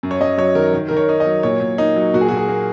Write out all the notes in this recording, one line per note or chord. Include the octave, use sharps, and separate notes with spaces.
F#2
C#5
F#2 D#5
F#3 C#5
D#3 A#4
D#3
D#3 A#4
C#5
D#4
D#5
F#3
A#2 C#5
A#2
A#3 D#4
F#3
A#2 F#4
G#4
F#4
A#2
G#4
A#3